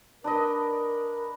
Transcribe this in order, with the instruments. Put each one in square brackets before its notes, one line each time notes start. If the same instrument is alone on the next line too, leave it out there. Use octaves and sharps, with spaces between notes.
[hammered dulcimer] D4 B4 D#5 [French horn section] A#4